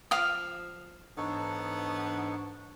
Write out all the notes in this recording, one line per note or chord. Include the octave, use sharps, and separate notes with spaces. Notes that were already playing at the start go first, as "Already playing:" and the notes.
F3 F5 D#6
G#2 E3 B3 D4 D#4 A4 C#5